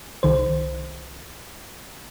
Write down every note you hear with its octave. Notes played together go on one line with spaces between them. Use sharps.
C2 D#3 C5